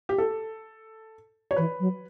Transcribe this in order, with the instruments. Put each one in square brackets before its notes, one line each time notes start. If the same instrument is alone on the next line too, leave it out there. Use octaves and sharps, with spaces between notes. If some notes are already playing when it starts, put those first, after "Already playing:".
[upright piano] G4
A4
C#5
[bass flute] E3 [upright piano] B4
[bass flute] F#3